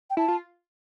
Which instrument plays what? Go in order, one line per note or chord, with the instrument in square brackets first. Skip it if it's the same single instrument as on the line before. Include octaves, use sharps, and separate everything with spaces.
[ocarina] G5
[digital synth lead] E4 [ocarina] A5
[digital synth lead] F4